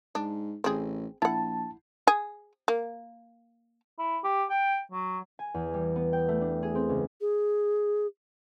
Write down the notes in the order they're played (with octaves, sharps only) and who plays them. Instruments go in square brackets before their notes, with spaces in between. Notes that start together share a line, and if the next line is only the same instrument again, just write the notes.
[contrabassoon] G#2 [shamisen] D4
[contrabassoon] A1 [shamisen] C4 G#4
[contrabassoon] A#1 [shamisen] E4 F#5 [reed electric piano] A5
[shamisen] G#4
A#3
[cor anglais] E4
G4
G5
F#3
[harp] G#5
E2
G3
B3
G5
A3
D4
G#4
C4
C#2
[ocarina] G#4